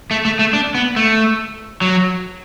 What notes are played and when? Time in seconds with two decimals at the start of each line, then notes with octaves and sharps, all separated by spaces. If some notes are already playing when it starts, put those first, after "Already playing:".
0.11 A3
0.25 A3
0.39 A3
0.53 D4
0.75 B3
0.96 A3
1.82 F#3